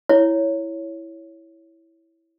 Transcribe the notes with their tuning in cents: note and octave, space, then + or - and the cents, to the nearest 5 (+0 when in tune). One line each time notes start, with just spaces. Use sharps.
E4 +0 C#5 +0